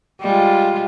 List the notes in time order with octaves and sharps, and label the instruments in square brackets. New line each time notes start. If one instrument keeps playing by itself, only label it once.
[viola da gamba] G3 G#3 F4